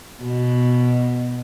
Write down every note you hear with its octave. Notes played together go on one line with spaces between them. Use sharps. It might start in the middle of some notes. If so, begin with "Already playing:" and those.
B2